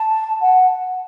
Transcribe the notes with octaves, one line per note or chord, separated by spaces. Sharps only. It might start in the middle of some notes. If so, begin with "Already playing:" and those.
Already playing: A5
F#5